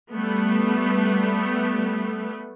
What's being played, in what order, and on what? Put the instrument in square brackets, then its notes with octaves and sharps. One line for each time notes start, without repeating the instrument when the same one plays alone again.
[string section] G3 A3 B3